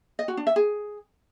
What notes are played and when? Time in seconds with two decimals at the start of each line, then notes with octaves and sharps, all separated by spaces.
0.19 D#5
0.28 F#4
0.37 D4
0.47 E5
0.56 G#4